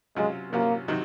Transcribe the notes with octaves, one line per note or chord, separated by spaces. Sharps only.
C3 F#3 G#3 C#4 F4
C3 F#3 A#3 C#4 F4
C3 D#3 F#3